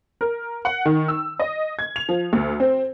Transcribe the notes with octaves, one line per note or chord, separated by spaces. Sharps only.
A#4
F#5
D#3
E6
D#5
G#6
F7
F3
D2
C4